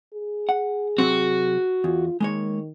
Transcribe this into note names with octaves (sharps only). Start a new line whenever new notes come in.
G#4
F#5
C3 F#3 C4 F#4
E2 F4
D#3 G#3 A#3 C#5